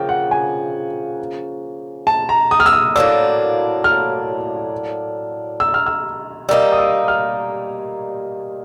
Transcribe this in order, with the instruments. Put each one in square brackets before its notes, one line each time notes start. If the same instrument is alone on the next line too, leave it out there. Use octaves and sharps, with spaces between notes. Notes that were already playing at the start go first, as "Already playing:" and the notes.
Already playing: [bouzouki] C#3 F3 A#3 [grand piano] G5
[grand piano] F#5
G#5
A5
A#5
D#6
F6
E6
D#6
[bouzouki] A2 F#3 A#3 D4 [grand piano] E6
[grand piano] F6
E6
F6
E6
[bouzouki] G3 A#3 D#4 [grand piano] E6
[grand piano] D#6
E6
F6